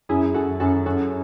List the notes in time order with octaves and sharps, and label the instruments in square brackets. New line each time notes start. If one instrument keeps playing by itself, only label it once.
[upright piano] F#2 [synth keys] E4 G#4
[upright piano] F#2 [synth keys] F#4 A4
[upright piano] F#2 [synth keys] F#4 A4
[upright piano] F#2 [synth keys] F#4 A4